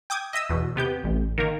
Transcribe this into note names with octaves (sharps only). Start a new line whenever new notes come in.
G5 D6 D#6 G#6
D#5 E5 D#6 E6
E2 B2
C3 B3 G4 G6
A1
D#3 A#3 A#4